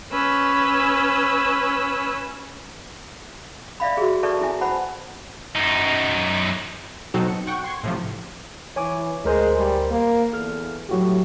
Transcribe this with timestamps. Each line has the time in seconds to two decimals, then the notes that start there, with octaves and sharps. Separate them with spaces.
0.12 C#4 B4 E6
3.80 D5 E5 F5 B5
3.97 F#4 G#4
4.23 A4 B4 D5 E5 A5 C#6
4.41 E4 G#5
4.61 C5 F#5 A5 B5
5.56 F#2 D#4
7.14 B2 F#3 C4 D#4 F#4 A4
7.28 C#7
7.47 F#5 G5 C#6
7.64 C6 C#6 G#6
7.83 A2 C3 F3
8.76 E3 C#5 G#5 D6
9.25 D2 G#3 A#4 C5
9.57 G3
9.90 A#3
10.33 E2 A4 F6
10.89 A2 F#3 F#4 G4